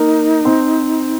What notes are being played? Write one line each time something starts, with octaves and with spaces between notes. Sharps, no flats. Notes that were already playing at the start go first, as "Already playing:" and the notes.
Already playing: A#3 D#4 A#4
C4 C5